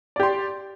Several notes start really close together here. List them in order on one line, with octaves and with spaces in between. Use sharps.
D5 G4 C6